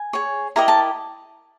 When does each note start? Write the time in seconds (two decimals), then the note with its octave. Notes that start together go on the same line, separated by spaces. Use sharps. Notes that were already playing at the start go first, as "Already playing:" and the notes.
Already playing: G#5
0.13 G#4 C#5
0.56 E4 G4 A#4 D#5 A#5
0.68 A5